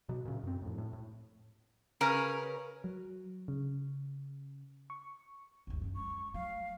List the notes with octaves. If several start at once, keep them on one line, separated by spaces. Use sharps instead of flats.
B2 F#3
A#2 C#3
F#2 C4
F2 A2
A2
A2
C#3 C#4 A#4 B4 C#5
F#3
C#3
C#6
G1 D#2
F#2 D4
F#3 G#3 C#6
F#3 A3 F5